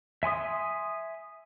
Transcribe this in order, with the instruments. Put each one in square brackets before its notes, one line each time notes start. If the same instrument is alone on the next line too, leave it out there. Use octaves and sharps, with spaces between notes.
[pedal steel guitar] E5 G#5 C6 D#6